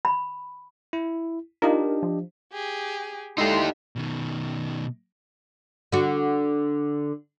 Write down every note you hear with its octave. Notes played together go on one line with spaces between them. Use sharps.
B5
E4
D4 D#4 F4 G4 A#4 D#5
F3
G4 G#4
G#3 D#4 E4 G4 A4 D5 E5 C6
B2 D#3
D3 F#4